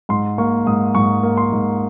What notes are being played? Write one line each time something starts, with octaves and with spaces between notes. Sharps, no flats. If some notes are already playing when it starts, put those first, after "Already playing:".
G#2 C6
A#3 C#6
G#2 D#6
G#2 C#6
A#3
C6
G#2